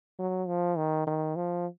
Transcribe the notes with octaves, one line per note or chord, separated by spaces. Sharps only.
F#3
F3
D#3
D#3
F3